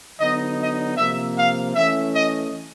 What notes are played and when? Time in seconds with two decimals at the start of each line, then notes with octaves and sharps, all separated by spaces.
0.20 D3 F#3 B3 D#4 D#5
0.59 D#5
0.98 C3 F3 A#3 E5
1.36 F5
1.75 E3 A3 C#4 E5
2.14 D#5